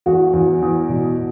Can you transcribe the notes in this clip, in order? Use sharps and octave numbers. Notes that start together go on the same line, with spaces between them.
E2 F#4
E2
E2
B2